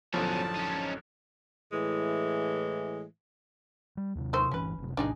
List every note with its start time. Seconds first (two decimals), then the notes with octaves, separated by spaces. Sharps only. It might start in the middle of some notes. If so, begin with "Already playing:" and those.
0.14 A1 F#2 B2 D3 F3 C#4 A5
0.55 C#4 D#4
1.73 A2 E3 G#3
3.97 G3
4.15 D#2 C3
4.33 D#3 A3 C5
4.51 G1 E3 C#4 B4
4.78 F#1 C3
4.97 A#1 A2 C3 D4 D#4 G#4